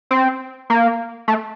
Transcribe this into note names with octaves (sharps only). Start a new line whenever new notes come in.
C4
A#3
A3